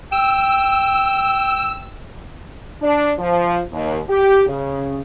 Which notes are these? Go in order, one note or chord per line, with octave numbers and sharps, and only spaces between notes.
G5 E6
D4
F3
D#2
G4
C#3